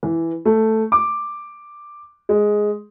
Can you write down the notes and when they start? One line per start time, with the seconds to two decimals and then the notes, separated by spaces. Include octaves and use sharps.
0.03 E3
0.45 A3
0.92 D6
2.29 G#3